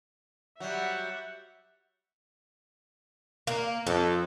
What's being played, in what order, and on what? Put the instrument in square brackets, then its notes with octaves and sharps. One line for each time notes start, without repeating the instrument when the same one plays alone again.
[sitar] F#3 G3 [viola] E5 F#5
[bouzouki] A#3
[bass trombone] F2 [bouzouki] A4